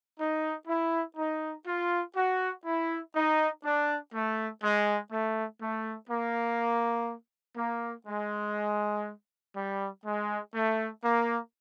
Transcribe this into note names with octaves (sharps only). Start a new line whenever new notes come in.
D#4
E4
D#4
F4
F#4
E4
D#4
D4
A3
G#3
A3
A3
A#3
A#3
G#3
G3
G#3
A3
A#3